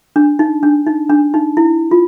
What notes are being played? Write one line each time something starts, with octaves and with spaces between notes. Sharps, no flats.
D4
D#4
D4
D#4
D4
D#4
E4
F4